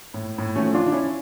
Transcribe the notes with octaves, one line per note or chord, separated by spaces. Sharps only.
A2
A2
A3 C#4
F3
D4 F4
F3 D4
C#4 E4